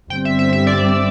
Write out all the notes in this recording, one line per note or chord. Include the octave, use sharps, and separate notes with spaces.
G1 G2 G3 C4 G5
E5
E5
E5
D5